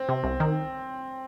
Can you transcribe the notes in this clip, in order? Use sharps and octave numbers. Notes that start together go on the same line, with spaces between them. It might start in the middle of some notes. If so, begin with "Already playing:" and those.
Already playing: C4
C3
C2
D#3